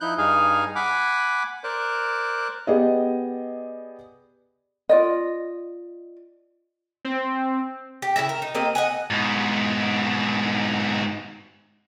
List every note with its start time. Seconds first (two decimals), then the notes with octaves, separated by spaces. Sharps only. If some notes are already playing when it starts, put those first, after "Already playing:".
0.01 F3 D#4 E4 F#6 G6
0.18 G2 D#4 G#4 F5 G#5
0.76 F#5 G#5 B5 D6
1.64 A#4 C5 D5 F#6
2.67 B3 G4 G#4 D5 D#5
4.89 F4 D5 D#5
7.05 C4
8.02 G4
8.16 C#3 A#3 E4 E5
8.29 A#4
8.42 D#4
8.55 A#3 C4 G4 D#5
8.75 D#5 F#5 G#5
9.10 G#2 B2